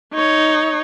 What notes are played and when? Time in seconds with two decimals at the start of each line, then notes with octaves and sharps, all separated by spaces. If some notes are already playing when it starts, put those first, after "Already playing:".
0.14 D#4 C#5